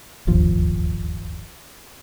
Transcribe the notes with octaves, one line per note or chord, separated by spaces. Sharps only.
D1 G1 D#2 F3